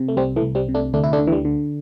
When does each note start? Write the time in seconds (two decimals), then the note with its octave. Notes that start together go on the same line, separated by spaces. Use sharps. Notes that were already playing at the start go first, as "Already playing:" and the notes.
Already playing: C3
0.08 A3
0.17 C2 G3 C4
0.36 E3 A3
0.42 C2
0.55 G3 C4
0.69 C3
0.75 A3 D4
0.93 D2 A3 D4
1.04 E4
1.13 A3 D4
1.19 D3
1.27 E3
1.32 G3
1.45 D3